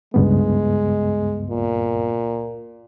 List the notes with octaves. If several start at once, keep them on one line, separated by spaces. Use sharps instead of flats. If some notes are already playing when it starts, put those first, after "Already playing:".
C#2 G2 G#3 B3
A#2